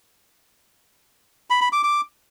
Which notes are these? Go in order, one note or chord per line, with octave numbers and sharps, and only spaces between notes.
B5
B5
D6
D6